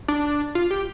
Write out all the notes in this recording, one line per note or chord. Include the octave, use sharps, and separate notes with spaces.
D4
F4
G4